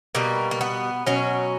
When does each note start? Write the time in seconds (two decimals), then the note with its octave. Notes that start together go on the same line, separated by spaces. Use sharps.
0.15 B2 G3 A#3
0.51 A#3
0.61 B3
1.07 B2 F#3 C#4